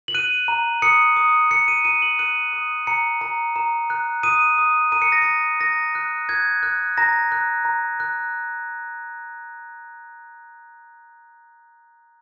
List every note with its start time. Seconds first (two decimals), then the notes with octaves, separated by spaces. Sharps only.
0.08 F#7
0.14 F#6 D#7
0.48 A#5
0.82 D#6 C#7
1.16 D#6
1.51 D#6 C#7
1.68 D#7
1.85 A#5 D#7
2.02 F#7
2.19 F#6 D#7
2.53 D#6
2.87 A#5 C#7
3.21 A#5
3.56 A#5
3.90 F#6
4.23 D#6 D#7
4.58 D#6
4.92 A#5 D#7
5.02 C#7
5.12 A#6
5.22 A#5 C#7
5.60 A#5 A#6
5.95 F#6
6.29 F#6 G#6
6.63 F#6
6.97 A#5 A#6
7.32 F#6
7.65 A#5
8.00 F#6